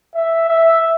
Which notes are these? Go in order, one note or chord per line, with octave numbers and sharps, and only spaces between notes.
E5
E5